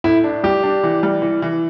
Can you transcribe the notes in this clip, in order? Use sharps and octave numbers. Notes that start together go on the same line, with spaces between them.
A2 E4
D4
G3 G4
D4
E3
G3
E3
E3